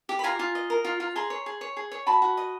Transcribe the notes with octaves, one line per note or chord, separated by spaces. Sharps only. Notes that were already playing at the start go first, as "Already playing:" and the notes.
G4
B5
F4 G#5 A#5
F4
D#5
A#4
F4
F4
G#4 A#5 C6
C#5
G#4
C#5
G#4
C#5
F#4 A5 B5
F#4
D#5